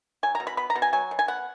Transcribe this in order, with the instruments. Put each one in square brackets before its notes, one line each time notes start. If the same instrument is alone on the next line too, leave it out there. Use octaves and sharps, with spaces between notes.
[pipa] F#3 G#5
A#5
B2
B5
B3 B5
A#5
B2
G#5
F#3 G#5
B2
G#5
B3 F#5